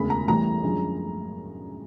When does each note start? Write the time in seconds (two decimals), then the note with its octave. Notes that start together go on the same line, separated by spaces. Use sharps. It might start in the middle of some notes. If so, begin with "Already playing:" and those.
Already playing: E1 D2 C#3 B5
0.10 A#5
0.28 A1 A2 E3 G3 A#5
0.63 F#2 D3 F3 G#3 C#4